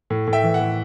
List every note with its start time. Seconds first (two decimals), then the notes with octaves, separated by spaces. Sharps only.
0.10 A2
0.27 A2
0.33 E5 G5
0.43 E3
0.54 F#5
0.60 A2